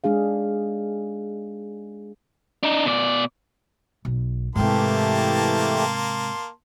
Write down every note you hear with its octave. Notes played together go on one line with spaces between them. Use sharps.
G#3 D4 G#4 F5
D4 D#4
B2 D5
B1
G#2 C3 E3 A3 A#3 G4 A5 C6